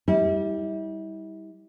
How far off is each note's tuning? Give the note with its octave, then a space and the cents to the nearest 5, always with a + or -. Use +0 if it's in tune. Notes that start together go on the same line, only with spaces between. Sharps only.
G3 +0 E4 -40